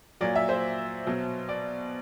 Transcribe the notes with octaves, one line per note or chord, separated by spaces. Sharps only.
A#2 F#3 D5
E5
C5
B2 F#3
D5